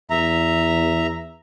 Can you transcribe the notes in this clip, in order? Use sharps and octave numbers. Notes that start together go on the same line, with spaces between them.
E2 E5 A#5